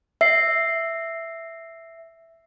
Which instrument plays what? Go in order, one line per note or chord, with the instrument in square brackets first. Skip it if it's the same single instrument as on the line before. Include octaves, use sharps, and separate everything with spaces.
[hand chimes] E5 C7